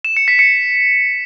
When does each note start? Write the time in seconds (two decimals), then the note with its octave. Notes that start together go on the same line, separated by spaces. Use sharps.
0.05 E7
0.17 C#7
0.28 B6
0.39 C#7